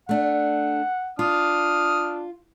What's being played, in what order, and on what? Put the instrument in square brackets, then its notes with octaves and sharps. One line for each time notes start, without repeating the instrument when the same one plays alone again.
[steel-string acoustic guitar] A3 D4 [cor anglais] F#5
[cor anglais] D4 [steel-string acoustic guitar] F4 [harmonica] D#6 F6